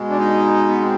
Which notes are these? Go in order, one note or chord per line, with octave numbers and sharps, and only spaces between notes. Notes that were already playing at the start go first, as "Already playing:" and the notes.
Already playing: B2 G#3
D4
D#4
B3
C4